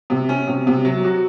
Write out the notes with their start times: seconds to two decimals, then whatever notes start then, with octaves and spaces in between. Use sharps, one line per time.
0.10 C3
0.29 C#4
0.47 C3
0.67 C3
0.85 F#3
1.04 F#4